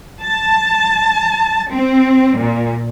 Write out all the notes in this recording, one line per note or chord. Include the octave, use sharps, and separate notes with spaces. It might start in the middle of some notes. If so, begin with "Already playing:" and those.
A5
C4
A#2